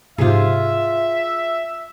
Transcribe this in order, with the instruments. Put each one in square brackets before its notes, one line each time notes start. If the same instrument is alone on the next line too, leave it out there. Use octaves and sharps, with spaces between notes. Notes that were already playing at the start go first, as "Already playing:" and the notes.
[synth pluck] G#2 C3 F3 [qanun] F4 G#4 [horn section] E5